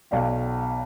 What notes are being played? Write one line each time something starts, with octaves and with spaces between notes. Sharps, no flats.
B1 D5 F5 G5